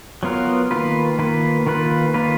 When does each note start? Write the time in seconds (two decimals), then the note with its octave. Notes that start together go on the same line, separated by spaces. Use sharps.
0.23 F#3 B3 F4 A#4
0.71 D#3 A#3 F4 B4
1.19 D#3 A#3 F4 B4
1.67 D#3 A#3 F4 B4
2.14 D#3 A#3 F4 B4